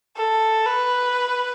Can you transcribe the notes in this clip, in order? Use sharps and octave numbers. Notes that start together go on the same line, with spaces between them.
A4
B4